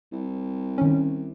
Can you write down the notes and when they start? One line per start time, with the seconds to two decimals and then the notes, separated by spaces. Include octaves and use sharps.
0.12 C2
0.78 D#3 C#4